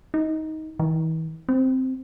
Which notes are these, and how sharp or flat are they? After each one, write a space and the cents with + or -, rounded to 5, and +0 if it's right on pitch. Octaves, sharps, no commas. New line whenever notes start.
D#4 +15
E3 -45
C4 -5